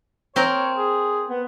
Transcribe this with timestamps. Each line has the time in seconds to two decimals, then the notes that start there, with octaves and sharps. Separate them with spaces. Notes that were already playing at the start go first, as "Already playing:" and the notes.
0.36 C4 A#4 C#5
0.78 G#4
1.29 B3